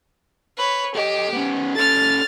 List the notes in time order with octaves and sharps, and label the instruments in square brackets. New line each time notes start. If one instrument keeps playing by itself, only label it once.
[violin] B4 C#5
[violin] G4 [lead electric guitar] A4 D#5
[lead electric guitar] B3 C#4
[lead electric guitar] C#4 A4 [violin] F6 A6